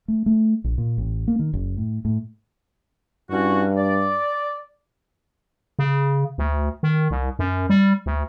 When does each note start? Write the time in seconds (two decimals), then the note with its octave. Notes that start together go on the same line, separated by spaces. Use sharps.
0.08 A3
0.26 A3
0.64 A#1
0.78 A#2
0.98 A1
1.28 A#3
1.39 D#3
1.53 F#1
1.77 A2
2.05 A2
3.30 G2 C#4 E4 F#4
3.77 D5
5.79 C#3
6.38 D2
6.83 D#3
7.11 C2
7.39 F#2
7.69 G3
8.06 D2